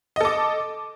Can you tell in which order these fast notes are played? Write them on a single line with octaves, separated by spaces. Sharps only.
D#5 A4 D6